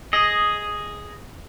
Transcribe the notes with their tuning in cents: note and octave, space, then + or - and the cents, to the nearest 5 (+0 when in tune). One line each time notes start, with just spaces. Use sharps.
G#4 +0 D#5 +0